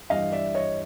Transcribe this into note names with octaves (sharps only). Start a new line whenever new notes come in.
G2 E3 G3 D#5 F5
D5 E5
C#5 D#5